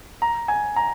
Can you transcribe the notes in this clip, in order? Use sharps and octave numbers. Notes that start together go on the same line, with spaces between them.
A#5
G#5
A#5